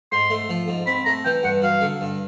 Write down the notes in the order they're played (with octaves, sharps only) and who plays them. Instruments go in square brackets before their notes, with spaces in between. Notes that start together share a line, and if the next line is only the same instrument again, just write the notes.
[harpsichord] G#2 [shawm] C6
[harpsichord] A3
F3
G#2
[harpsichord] C4 [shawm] B5
[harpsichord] A3 [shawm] A#5
[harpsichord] E3 [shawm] G5
[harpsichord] G2 [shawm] F#5
[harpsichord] F#3 [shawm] F5
[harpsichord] D3
G2